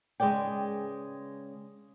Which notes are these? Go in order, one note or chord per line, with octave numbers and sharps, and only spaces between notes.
C#3 G#3 B4 D5 G5